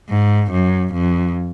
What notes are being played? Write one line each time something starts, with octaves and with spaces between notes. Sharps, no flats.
G#2
F#2
F2